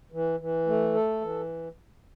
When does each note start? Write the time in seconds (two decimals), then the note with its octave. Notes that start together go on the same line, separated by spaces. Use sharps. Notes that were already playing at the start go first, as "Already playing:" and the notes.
0.12 E3
0.40 E3
0.67 A3
0.94 A4
1.21 E3